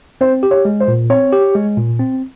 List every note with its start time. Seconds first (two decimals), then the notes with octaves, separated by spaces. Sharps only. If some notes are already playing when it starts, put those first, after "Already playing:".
0.21 C4 C5
0.43 G4
0.51 C#5
0.65 G#3
0.80 C5
0.88 A#2
1.10 C4 C#5
1.32 G4
1.55 G#3
1.77 A#2
1.99 C4